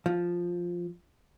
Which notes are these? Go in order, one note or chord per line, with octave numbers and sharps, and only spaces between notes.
F3